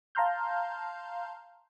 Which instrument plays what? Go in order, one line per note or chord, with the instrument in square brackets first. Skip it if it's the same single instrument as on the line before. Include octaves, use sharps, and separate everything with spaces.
[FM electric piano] F5 A5 A#5 C6 F6 G6